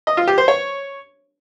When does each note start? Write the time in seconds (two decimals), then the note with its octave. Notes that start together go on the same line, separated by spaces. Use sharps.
0.07 D#5
0.17 F4
0.27 G4
0.38 C5
0.48 C#5